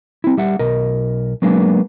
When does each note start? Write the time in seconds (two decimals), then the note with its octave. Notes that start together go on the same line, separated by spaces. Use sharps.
0.24 C4 E4
0.37 G3 E5 F#5
0.59 B1 A#4 D#5
1.42 F#3 G#3 A#3 B3 D4